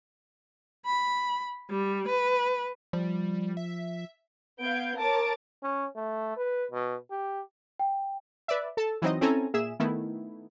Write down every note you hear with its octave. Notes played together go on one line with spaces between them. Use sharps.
B5
G3
B4
F3 G3
E5
B3 F5 G6 G#6 D7
A#4 C#5 A5 D6 A6 D7
C#4
A3
B4
B2
G4
G5
B4 D5 E5
A4 A5
E3 F#3 C4 D#4 D#5
C4 C#4 E4 A4 G#5 A#5
A#2 G#4 E5 E7
D#3 A3 B3 E4